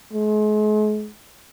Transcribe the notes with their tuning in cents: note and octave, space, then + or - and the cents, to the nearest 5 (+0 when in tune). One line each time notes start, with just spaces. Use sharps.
G#3 +40